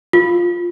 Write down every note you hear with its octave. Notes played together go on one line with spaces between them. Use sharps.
F4